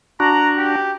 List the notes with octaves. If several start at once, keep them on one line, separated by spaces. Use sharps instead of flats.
D4 F#4 A#5
G4